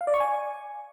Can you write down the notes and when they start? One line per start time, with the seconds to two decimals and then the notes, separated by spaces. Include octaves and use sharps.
0.01 F5
0.07 D5
0.14 C#6
0.20 G#5